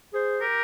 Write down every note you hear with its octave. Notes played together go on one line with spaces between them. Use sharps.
G#4 C5
G4 A#4